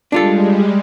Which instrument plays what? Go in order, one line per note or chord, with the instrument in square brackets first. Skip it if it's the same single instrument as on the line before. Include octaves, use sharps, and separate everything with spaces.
[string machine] G3 G#3 [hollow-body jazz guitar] D4 F4 A4